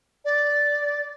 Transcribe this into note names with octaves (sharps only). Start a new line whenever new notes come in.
D5